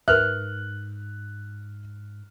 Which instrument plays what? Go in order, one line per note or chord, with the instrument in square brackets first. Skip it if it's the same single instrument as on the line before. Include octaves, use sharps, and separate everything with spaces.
[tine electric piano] G#2 [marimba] A#4 B4 E5 [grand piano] F6 F#6